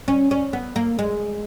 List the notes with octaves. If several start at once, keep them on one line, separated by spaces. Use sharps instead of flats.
C#4
C#4
B3
A#3
G#3